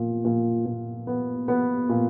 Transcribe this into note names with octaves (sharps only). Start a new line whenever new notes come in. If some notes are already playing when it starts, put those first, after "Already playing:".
Already playing: A#2 B3
A#2
A#2
B3
B3 B4
A#2